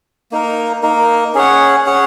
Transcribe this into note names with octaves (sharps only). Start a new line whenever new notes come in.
A#3 D#4 A#4
A#3 D#4 A#4
C#4 G#4 C#5 F#5
C#4 G#4 C#5 F#5